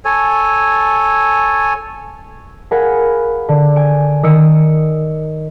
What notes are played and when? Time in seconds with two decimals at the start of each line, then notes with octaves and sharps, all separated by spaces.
0.05 A4 C#5 G#5
2.71 G#4 A#4 F5 F#5 G#5 B5
3.49 D3
3.76 G#5 D7
4.23 D#3 D#6 E6 C#7 D7